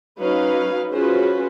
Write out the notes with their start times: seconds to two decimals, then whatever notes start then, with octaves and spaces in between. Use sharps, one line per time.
0.18 F#3 C#4 D#4 B4 C#5 F5
0.91 C#4 F4 F#4 G#4 B4 C5